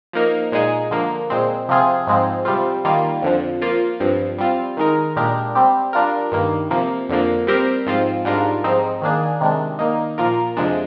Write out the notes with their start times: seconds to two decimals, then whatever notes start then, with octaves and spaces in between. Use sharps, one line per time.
0.13 F3 A#3 D#4 A#4
0.52 A#2 G#3 D#4 G#4
0.91 D3 F3 A#3
1.30 A#2 G#3 C4
1.69 C3 F3 C4 F4 G#4
2.07 G#2 F3 G#3 C4
2.45 C3 G3 C4 F4
2.85 D#3 G3 A#3 F4
3.22 F2 D3 F3
3.61 F3 A#3 F4
4.00 G2 F3 C4
4.38 G3 C4 F4
4.77 D#3 G#3 D#4 A#4
5.16 A#2 G#3 D4 G4 A#4
5.55 G3 C4 G4
5.93 G3 D4 F4 A#4
6.32 G2 D#3 A#3
6.71 C3 F3 A#3
7.09 F2 D3 F3 A#3
7.47 G3 C4 G4 A#4
7.86 G#2 F3 C4 F4
8.25 G#2 G3 D4 F4 A#4
8.64 G#2 F3 C4 D#4
9.02 D#3 A#3 D4 G#4
9.41 C3 D#3 G#3 D4
9.79 D#3 A#3 D#4
10.18 A#2 F3 A#3 F4 A#4
10.57 F2 C3 F3 G#3 D4